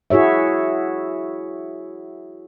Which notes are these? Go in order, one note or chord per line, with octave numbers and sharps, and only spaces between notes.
E4 F#4 G#4 C#5 E5